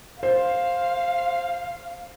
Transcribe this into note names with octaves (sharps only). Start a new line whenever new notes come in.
C5 F5